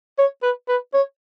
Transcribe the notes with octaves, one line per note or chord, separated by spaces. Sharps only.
C#5
B4
B4
C#5